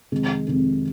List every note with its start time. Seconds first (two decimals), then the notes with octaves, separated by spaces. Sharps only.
0.12 F2 C3 D#3 G#3
0.48 F2 C3 D#3 G#3